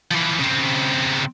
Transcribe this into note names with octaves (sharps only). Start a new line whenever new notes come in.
E3 F3
C#3 C4